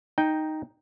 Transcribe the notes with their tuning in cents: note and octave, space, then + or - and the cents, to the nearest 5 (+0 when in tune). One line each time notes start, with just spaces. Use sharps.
D#4 +0 G5 +0